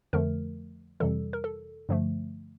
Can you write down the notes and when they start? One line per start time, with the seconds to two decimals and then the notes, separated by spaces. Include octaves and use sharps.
0.13 F2 D3 F3 A3 A#4
1.00 F2 C3 E3 G3 A4
1.33 A#4
1.44 A4
1.89 G2 D3 F3 A3